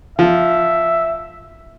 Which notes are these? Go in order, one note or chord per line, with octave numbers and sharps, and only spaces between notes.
F3 E5